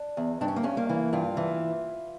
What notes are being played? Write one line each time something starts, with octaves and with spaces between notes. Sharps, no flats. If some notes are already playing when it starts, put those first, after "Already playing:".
Already playing: D4
E2
G2 D4
C#4
A#3
G2 C#4
A#3
E3
G2 F4
E3